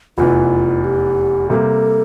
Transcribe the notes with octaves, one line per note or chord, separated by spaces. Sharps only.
F1 E2 E3 F4
G4
C3 G3 A#3 A4